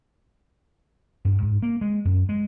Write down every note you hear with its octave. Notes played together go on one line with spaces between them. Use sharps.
G2
G#2
A#3
G#3
F#2
G#3